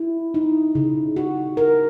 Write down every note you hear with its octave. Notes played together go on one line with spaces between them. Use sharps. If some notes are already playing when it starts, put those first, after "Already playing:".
Already playing: E4
D#4
C#3
F#4
A#4